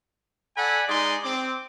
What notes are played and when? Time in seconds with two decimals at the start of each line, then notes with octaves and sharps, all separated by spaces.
0.57 A4 D5 F#5 G#5 B5
0.88 G#3 D#4 G#4 D5 C6
1.24 C4 D6